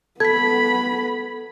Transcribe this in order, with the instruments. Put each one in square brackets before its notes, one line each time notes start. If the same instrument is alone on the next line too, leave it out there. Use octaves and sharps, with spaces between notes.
[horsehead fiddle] B3 B5 [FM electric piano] A4 [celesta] G#6 B6